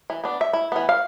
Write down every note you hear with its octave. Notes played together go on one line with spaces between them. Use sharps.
E3
B3 D4
E5
E4
E3 B3
F5